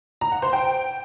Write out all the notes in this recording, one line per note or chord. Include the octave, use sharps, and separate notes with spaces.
A#5
F#5
C5
G5